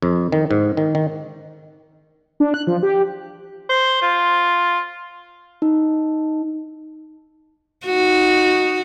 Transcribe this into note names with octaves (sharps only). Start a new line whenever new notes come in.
F2
D#3
G#2
D#3
D#3
D4
F#6
F3
G4
C5
F4
D#4
D#4 F#4